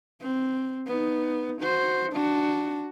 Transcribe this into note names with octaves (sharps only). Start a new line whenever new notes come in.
C4
B3 D#4
F#4 C5
D4 F#4